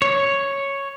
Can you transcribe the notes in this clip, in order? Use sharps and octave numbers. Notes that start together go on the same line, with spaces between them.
C#5